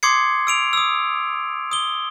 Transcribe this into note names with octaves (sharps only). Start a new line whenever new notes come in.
C6 D6 D#6 G#6 C7 C#7
E6 D7 F7
D#6 E6
D#6 G7